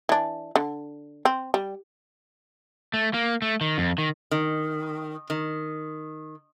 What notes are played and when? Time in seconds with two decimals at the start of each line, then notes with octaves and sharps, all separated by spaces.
0.09 E3 D4
0.56 D3
1.25 C4
1.54 G3
2.94 A3
3.14 A#3
3.42 A3
3.61 D#3
3.78 F2
3.98 D#3
4.31 D#3
5.30 D#3